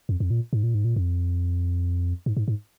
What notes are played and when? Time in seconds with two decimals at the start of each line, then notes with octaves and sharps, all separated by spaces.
0.09 F2
0.20 F2
0.31 A#2
0.53 G#2
0.63 A#2
0.75 G#2
0.85 A#2
0.96 F2
2.26 G#2
2.37 G#2
2.48 G#2